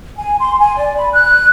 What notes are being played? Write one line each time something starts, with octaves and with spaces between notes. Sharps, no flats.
G#5
C6
G#5
D5
B5
F#6